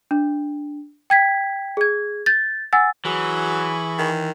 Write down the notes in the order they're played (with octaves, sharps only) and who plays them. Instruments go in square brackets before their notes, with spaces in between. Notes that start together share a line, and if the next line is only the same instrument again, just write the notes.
[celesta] D4
G5 G#6 B6
G#4 G#6
G6 A6
F#5 G#5 E6 A6
[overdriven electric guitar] E3 [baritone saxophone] F#3 [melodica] G#4 B5 C#6
[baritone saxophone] D#3